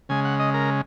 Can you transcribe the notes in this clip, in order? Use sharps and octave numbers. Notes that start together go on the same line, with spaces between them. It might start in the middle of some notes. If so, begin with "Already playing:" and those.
C#3 G#3 G#5
F#5
D#5
A#4